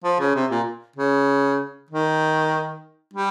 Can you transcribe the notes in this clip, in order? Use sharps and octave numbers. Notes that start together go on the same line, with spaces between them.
F3
C#3
C3
A#2
C#3
D#3
G3